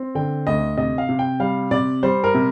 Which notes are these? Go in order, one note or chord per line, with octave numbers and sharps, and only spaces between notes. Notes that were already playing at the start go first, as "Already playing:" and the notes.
Already playing: C4
D3 G5
D2 D#5
C3 D#5
F5
C3
G5
G3 F5
C3 D5
G3 C5
A#4
C3